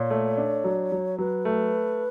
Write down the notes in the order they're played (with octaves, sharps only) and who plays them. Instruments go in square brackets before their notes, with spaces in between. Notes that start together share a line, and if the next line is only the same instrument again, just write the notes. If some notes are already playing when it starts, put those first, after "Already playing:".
Already playing: [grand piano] A#2 [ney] C#5
[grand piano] A3
D4
F#3
F#3
[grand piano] F#3 [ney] B4
[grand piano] A3